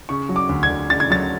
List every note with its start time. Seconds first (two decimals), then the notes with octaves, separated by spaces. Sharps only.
0.09 C#3 C#6
0.29 F#3
0.36 D6
0.49 D2
0.63 G#6
0.69 D2
0.89 C#3 A6
1.00 G#6
1.10 F#3 A6